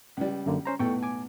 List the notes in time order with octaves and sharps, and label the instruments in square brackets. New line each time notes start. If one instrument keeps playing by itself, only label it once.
[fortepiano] C#2 G3
[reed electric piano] F#2 D3 A#3
C#4 C5 A#5
[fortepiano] B1 E2 A2 [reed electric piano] A4 G5 C#6
[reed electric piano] G#5 D6